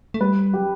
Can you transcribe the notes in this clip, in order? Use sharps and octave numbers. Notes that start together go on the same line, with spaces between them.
A3
G3 B4
F#3 G4